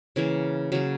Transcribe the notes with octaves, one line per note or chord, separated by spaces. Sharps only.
C#3 E3 A#3
C#3 F#3 A#3